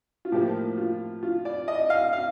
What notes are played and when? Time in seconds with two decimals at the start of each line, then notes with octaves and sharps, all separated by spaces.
0.25 F4
0.32 A2 F3 A#3 G4
0.78 F4
1.23 F4
1.45 D5
1.68 D#5
1.90 F5
2.13 F5